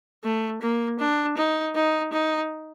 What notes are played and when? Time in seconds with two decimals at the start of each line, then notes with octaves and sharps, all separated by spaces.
0.23 A3
0.61 A#3
0.99 D4
1.37 D#4
1.75 D#4
2.13 D#4